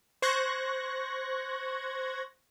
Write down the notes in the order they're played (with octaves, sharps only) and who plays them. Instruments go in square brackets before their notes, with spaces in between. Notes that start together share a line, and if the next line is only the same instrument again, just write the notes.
[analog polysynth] C5 C#6 F#6 G#6 A#6